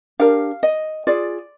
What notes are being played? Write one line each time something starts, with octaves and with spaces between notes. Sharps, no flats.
D4 G4 A#4 F5
D#5
F4 G#4 D5